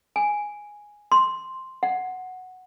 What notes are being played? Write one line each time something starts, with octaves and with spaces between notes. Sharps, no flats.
G#5
C6
F#5